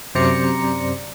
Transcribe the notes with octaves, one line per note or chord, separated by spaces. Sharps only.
F#2 C3 C5 D5 A#5 C#7